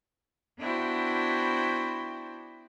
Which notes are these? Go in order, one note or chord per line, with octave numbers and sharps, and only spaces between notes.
B3 D4 E4 F#4 C5 G5